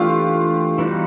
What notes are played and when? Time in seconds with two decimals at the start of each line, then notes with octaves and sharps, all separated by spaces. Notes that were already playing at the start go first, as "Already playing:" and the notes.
Already playing: E3 A3 D4 F4 G4
0.78 E3 G3 B3 D#4 F#4